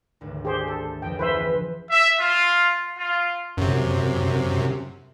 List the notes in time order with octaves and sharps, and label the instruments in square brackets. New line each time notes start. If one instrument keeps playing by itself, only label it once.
[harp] G#1 D2
[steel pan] G4 G#4 C5
A4
[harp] F2 F3 G#4 [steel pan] G5
[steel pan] B4 C5 E5
[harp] E3 F4
[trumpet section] E5
F4
F4
[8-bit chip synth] F#2 C3